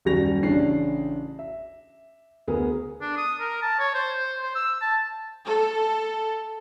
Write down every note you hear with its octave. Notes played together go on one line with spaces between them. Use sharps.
D#1 F#2 G3 F#4 A#6 F7
A1 C#3 C#4 D4 C7
E5
D2 B3 G#4 A#4
D4
D#6
A#4
A5
C#5
C5
C5
C5
E6
A5
A4